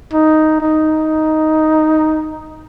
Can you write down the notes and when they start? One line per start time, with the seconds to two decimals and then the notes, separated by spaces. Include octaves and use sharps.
0.13 D#4
0.61 D#4